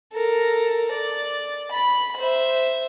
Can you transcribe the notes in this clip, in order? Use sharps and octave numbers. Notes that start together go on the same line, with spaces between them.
A4 A#4
D5
B5
C5 E5